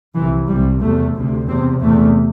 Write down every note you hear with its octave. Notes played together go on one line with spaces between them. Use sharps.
C2 C3 E3
C2 C3 G3
E2 C3 A3
D2 C3
E2 C3 C4
E2 C3 A3